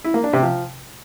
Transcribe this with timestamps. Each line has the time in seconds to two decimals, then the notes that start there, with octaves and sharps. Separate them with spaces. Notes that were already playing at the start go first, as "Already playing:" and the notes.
0.04 E4
0.14 A#3
0.24 D4
0.33 C3
0.43 F3